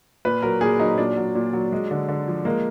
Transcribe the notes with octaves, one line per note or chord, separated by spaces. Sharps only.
A#2 B4
F#3 A#4
A#2 G#4
F#3 D#4
A#2 D4
F#3
A#2
F#3
G#3
D3
D3
F3
G#3 A#3